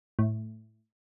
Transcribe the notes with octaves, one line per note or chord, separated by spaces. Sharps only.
A2